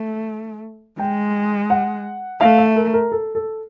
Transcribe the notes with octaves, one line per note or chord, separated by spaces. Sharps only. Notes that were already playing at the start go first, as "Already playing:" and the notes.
Already playing: A3
G#3 G5
F#5
A3 F5
E5
A#4
A#4
A4
A4